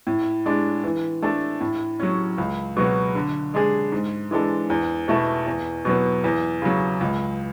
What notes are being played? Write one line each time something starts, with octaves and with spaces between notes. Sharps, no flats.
A2
G#3 D4
E3
A3 D4 A4
A2
F#3 C#4
C#2
B2 F#3 B3 F#4
D3
G#3 D4 G#4
G#2
E3 G#3 D4 A4
E2
B2 A3 E4 A4
E2
B2 F#3 B3
E2
C#3 F#3
C#2